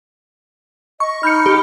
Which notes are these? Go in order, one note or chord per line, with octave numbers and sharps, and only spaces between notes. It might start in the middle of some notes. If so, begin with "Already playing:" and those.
D#5 C#6
D#4 B5 F6 G6 C#7
G4